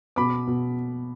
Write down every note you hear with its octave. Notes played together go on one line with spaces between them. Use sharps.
B2 B5 D6
B2